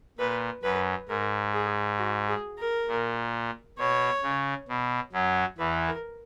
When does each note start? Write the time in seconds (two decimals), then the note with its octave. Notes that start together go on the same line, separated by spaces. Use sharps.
0.19 A#2 B4
0.63 F#2 B4
1.09 G#2 A#4
1.54 G#4
1.99 F#4
2.28 G#4
2.59 A#4
2.88 A#2
3.78 B2 C#5
4.23 C#3
4.68 B2
5.13 F#2 F#3
5.58 E2 E3 B4
5.88 A#4